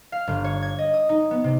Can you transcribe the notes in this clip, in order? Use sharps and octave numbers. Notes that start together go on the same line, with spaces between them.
F5
G1
C#5
G#6
D#5
D#6
D#4
B3
C3